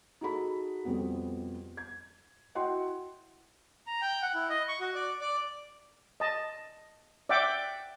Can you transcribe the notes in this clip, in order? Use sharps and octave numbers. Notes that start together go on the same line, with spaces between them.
D#4 F#4 G#4 A4 B5
F2 B2 G3 B3
G#6
E4 F#4 D#5 F#5 G5 C6
A#5
G5
F#5
E4
D#5
C#6
F#4
D5
D5
D#5 A5
D5 E5 F#5 G5 D6